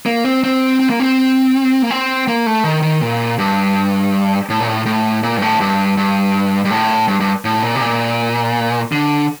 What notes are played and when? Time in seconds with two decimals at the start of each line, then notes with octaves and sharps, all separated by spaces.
0.06 A#3
0.25 C4
0.44 C4
0.80 C4
0.90 A#3
1.00 C4
1.82 A#3
1.90 C4
2.28 A#3
2.46 A3
2.64 D#3
2.83 D#3
3.01 A#2
3.39 G2
4.50 A2
4.60 A#2
4.68 A2
4.86 A2
5.23 A#2
5.37 G2
5.42 A2
5.60 G2
5.97 G2
6.65 G2
6.71 A2
7.08 G2
7.20 G2
7.45 A2
7.63 A#2
7.75 C3
7.81 A#2
8.92 D3